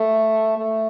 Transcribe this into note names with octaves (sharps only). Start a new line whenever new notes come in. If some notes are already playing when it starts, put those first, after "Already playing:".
Already playing: A3
A3